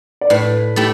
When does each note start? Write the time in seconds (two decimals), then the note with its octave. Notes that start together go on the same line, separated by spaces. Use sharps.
0.21 D5
0.30 A2 B4
0.76 A3 E4 G4